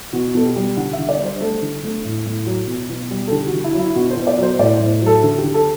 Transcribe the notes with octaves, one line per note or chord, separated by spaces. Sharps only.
B2 F#4
B2 A4
G4
G3
D3 F#5
E5
D3
D5
G3
C5
A3 A4
D3
A3
A2
A2
F#3
B2
B2
G3
A4
D3 G4
F#4
D3
E4
F#3
E4
B2 F#4
C5
B2
D5
F#3
C5
A2 D5
A2 C5
C5
F#3 A4
D3 A4
G4
D3
A4